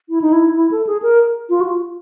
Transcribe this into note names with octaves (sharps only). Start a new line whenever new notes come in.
E4
D#4
E4
E4
A4
G#4
A#4
F4
F#4
F4